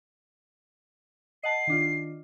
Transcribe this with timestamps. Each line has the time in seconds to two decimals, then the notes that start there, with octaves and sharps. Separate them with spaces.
1.43 D#5 F#5 A5 C7
1.67 D#3 D4 F4